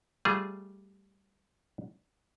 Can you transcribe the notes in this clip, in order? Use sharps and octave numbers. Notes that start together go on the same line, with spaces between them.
G3 A3 F4 G#4 C5